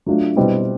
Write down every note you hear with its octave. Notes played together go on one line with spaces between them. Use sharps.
F#3 A3 D4 F4
B2 G3 C4 E4